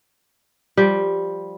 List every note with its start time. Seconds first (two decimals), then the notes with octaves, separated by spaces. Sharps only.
0.77 F3 G3 G5